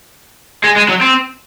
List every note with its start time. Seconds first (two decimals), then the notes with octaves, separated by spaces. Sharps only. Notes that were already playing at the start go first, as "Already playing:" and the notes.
0.64 G#3
0.76 G#3
0.89 F#3
1.01 C4